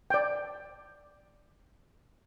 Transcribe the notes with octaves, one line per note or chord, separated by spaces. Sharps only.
D5 G5